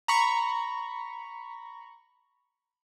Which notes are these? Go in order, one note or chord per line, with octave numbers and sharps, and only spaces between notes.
A#5 B5 C#6